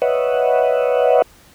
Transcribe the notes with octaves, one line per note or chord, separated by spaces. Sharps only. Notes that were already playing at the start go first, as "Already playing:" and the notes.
B4 C#5 D#5 E5 F#5